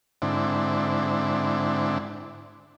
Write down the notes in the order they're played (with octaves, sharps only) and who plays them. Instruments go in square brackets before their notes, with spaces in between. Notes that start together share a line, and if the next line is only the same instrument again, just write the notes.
[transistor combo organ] G#2 D3 C4 D4 E4